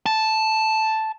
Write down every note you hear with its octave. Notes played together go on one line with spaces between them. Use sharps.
A5